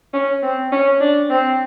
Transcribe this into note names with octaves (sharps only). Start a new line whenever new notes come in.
C#4
C4
C#4
D4
C4